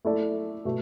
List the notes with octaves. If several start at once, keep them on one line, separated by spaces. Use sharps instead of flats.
A3 E4 A4 D5
B2 A3